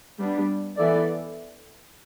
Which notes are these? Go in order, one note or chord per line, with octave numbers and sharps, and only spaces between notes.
G3 B3 D4
E3 B3 E4 A4 D5